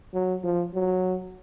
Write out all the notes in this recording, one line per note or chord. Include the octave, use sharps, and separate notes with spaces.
F#3
F3
F#3